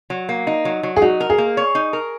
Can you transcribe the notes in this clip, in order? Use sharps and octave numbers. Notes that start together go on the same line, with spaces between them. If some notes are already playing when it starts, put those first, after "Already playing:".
F#3
A#3
D#4
F#3
F#3
G#4
D#4 F#4
A#4
G#4
A#3
C#5
D#4
A#4